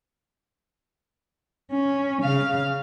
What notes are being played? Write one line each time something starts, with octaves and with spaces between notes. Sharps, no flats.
C#4
C#3 F5